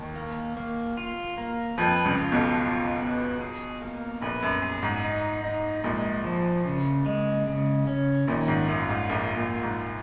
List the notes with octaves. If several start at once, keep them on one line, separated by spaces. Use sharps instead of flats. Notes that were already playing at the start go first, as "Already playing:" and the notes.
Already playing: D#2 D#3
A#3
A#3
F4
A#3
F2 F3 B4
C#2 C#3
F4
B1 B2
F4
B3
G#4
A#3
A#1 A#2 B4
F#2
G#4
G#2
D#4
D#4
A#1 A#2 G#3
F3
C#3
G#3
C#3
C#4
A#1 A#2 D#3
G#2
F#2 F4
G#2
A#1 A#2 F4
A#1 A#2
F4
G#2